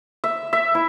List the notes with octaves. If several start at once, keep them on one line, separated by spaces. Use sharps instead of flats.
E5
E5
E4